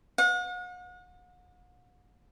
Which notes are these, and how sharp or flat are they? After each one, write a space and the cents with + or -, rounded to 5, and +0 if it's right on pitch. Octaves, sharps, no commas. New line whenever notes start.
F#5 -40